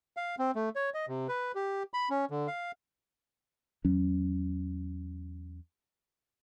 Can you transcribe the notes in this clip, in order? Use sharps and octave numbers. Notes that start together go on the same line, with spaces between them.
F5
C4
A3
C#5
D#5
C3
B4
G4
B5
C#4
D3
F5
E2 F#3 C#4